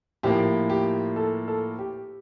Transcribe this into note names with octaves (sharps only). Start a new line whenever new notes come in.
A2 F3 A#3 G4
G4
A4
A4
G4